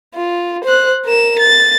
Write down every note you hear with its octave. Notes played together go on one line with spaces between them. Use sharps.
F4
C5 F#6
A#4 E7
A6